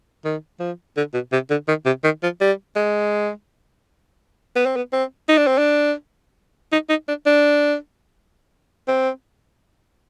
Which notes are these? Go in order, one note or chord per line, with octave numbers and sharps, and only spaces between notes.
D#3
F3
D3
B2
C3
D3
D#3
C3
D#3
F3
G3
G#3
B3
C4
B3
C4
D#4
D4
C4
D4
D#4
D#4
D4
D4
C4